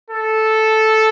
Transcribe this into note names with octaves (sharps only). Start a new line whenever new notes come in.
A4